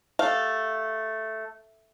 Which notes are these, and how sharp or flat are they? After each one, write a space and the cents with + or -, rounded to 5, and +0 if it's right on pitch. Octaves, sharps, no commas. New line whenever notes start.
A3 +0 G4 +0 F5 +0